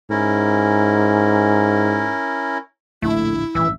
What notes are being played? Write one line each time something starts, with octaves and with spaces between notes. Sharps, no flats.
G#2 C#4 E4 A#4
D1 A#1 A3 D4 E4
A1 G2 E3 E5